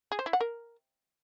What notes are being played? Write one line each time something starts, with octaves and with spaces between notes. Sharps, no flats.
G#4
C5
E4
F#5
A#4